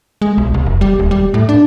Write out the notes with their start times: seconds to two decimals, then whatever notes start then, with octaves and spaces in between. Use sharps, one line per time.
0.22 G#3
0.38 B1
0.54 C2
0.66 F1
0.81 G3
0.99 D#1
1.11 G3
1.34 A2
1.49 D4